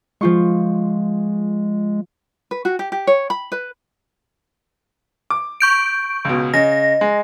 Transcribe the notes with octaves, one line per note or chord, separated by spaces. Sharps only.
F3 G#3 F4 C#6
B4
F#4
G4
G4
C#5
B5
B4
D6
C#6 G6 D7
C#2 B2
C#3 D#5 A#6
G#3